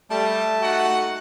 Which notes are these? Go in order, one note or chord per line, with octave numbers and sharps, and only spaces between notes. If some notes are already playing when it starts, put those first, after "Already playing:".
G3 A3 A5
D#4 F#4 F#5